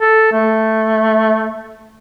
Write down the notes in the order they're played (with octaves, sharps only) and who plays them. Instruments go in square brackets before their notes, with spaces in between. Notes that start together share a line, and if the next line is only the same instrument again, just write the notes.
[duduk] A4
A3